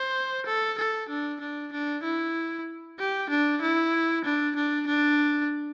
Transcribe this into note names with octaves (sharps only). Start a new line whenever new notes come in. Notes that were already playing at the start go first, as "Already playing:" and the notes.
Already playing: C5
A4
A4
D4
D4
D4
E4
G4
D4
E4
D4
D4
D4